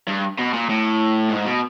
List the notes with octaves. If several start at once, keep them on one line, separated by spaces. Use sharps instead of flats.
G2
B2
A#2
A2
G#2
B2